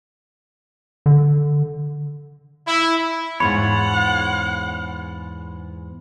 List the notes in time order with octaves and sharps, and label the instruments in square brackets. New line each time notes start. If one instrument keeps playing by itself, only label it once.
[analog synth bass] D3
[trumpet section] E4
[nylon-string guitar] E2 G#2 [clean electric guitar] F4 C#5 [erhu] F#5 [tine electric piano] B5